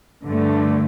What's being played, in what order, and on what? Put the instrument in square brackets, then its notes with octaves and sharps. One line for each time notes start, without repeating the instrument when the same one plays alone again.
[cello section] G2 D3 A3